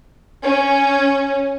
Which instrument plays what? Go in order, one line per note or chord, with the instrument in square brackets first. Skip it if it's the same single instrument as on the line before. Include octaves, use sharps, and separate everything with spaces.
[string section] C#4